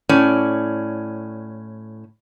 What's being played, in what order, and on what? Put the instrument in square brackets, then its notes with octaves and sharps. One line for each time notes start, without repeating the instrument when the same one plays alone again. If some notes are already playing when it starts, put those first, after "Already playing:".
[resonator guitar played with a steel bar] A2 C#4 D5